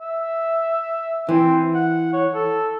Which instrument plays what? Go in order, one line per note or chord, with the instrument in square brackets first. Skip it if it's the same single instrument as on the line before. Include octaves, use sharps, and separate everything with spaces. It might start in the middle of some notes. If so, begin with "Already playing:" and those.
[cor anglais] E5
[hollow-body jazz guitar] E3 [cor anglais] C4
[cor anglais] F#5
C#5
A4